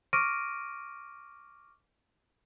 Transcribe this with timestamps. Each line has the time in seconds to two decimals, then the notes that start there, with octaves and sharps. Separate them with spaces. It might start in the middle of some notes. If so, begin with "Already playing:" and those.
0.13 C#6 D6 F6 A#6 D7 D#7